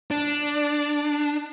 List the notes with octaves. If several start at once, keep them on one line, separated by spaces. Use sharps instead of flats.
D4